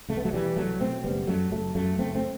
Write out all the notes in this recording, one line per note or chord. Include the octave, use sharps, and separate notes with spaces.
C2 A3
B3
F#3 A3
B2 E3 G3
C2 F#3 A3
B2 A3 C4
F#1 G3 B3
F#2 F#3 A3
F#1 F#3 A3
F#2 F#3 A3
F#1 A3 C4
A3 C4